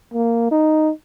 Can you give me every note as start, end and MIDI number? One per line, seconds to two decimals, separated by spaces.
0.14 0.51 58
0.51 0.90 63